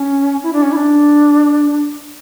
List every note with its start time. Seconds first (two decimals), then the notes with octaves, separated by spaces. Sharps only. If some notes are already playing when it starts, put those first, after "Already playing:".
Already playing: C#4
0.43 E4
0.53 D4
0.62 C#4
0.72 E4
0.76 D4